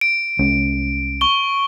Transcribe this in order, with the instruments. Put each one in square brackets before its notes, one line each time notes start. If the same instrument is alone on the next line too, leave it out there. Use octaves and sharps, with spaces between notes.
[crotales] D7
[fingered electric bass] C2 G#3 C#4
[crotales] C#6 G7